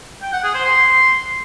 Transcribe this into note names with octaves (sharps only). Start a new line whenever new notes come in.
G5
F#5
G#4
C5
C6